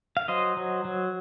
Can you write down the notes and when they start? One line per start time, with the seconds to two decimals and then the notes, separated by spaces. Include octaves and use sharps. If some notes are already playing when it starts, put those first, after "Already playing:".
0.17 F5
0.28 F#3 C5 D#5
0.57 F#3
0.85 F#3